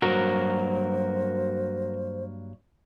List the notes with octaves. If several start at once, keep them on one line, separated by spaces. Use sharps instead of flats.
G2 F#3 A#3 F#4 A#4 C5